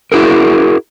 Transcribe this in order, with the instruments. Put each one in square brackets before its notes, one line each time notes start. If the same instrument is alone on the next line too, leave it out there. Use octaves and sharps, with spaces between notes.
[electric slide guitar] E4 F#4 G#4 A#4